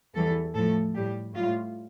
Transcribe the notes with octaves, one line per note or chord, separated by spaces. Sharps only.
E2 E3 G3 A4
A2 F3 A3 A4
A2 G3 G4
A2 G3 F4